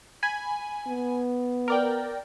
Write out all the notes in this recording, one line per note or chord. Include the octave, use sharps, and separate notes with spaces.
G#5 B5
B3
A#4 D5 G5